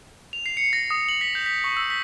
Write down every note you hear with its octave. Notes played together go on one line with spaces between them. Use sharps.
F7
C7
C#7
A#6
D#6
F#7
B6
G6
B6
C#6
E6
B6